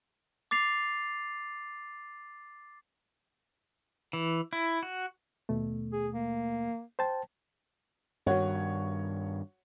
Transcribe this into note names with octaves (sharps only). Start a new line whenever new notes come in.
D6 A6 C7 F7
E3
E4
F#4
D#2 B2 A3
G#4
A#3
C5 G5 A5
G2 D#3 F#4 C#5 F#5